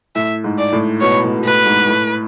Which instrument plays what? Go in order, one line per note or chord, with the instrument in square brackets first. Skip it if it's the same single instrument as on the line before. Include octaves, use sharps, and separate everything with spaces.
[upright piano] A2 [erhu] E5
[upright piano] G#2
[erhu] D5
[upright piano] A2
[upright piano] B2 [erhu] C#5
[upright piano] A2
B2
[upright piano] A2 [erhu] B4
[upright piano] G#2
A2